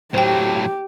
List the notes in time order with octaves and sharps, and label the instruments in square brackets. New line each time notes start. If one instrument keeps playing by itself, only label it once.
[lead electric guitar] A2 F#3 [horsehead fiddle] G4 [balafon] C5 G5